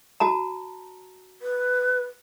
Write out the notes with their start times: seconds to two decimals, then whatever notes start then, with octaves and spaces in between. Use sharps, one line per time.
0.20 F#4 A5 A#5
1.42 B4